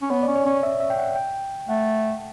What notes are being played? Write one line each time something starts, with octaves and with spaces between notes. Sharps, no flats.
C#4
B3 C#5
D5
C#4
C#5
C#4
E5
E5
G5
F#5
G5
A3 F#5